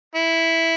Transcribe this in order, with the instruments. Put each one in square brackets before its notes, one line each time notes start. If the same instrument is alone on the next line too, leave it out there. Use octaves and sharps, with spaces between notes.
[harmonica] E4